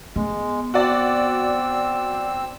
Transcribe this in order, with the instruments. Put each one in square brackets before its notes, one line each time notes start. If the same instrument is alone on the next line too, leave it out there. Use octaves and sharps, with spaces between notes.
[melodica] G#3 [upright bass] B3
[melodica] C4 E6 [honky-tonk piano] F#4 D5